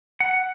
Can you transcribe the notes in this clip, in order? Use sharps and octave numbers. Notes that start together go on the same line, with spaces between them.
F#5